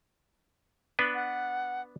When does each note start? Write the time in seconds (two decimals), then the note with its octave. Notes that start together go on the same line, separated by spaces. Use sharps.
0.99 B3 D4 B4
1.15 F#5